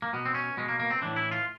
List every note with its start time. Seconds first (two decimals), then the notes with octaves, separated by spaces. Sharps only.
0.02 A#3
0.13 B2 B3
0.25 C4
0.34 C#4
0.57 B2 G#3
0.68 A#3
0.80 A#3
0.90 C4
1.01 A2 E3 D4
1.16 E4
1.31 F4